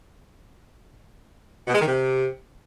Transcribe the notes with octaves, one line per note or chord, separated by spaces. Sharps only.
B2
G#3
D#3
C3